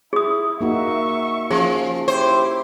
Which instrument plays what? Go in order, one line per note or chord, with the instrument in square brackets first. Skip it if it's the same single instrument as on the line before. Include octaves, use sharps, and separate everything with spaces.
[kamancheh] E4 [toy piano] G#4 D#6
[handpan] A#3 D#4 F#4 [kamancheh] E5 C#6
[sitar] F3 [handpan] C#4 [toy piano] G#4
[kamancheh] E4 G4 [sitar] C5